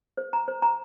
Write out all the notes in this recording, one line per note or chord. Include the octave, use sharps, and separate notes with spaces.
C5
A#5
C5
A#5